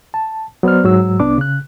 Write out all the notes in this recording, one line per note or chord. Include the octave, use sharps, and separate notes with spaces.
A5
F#3 B3 C5 D5 F6
G#2 F#3 E6
C2 B3 D4 D6
C#3 F#6